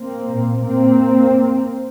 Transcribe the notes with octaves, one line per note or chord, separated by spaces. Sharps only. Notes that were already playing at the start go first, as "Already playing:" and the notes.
Already playing: A#3 C4
A#2
A#2 A#3 C4